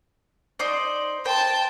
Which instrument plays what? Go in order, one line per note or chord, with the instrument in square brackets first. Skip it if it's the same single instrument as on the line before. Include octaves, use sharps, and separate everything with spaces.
[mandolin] D#4 C5 D5
[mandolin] C5 [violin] G5 A5